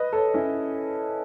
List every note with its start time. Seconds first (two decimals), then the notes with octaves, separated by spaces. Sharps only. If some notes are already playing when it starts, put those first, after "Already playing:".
Already playing: B4 D#5
0.13 A4 C#5
0.34 C#4 E4